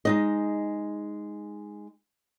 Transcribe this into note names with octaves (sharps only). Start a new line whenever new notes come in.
G#3 D#4 D#5